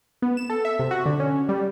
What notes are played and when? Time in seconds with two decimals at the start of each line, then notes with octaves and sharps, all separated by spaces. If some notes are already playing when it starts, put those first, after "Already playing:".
0.22 B3
0.37 E7
0.50 A4
0.65 E5
0.79 C3
0.91 F#4
1.06 D3
1.20 C#4
1.49 G3